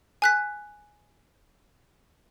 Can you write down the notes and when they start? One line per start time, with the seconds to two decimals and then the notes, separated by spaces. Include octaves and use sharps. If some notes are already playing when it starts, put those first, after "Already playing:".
0.22 G#5 F#6 B6